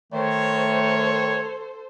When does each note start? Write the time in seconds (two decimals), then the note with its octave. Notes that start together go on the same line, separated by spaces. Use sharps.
0.13 D#3 A3 A4 C5 C#5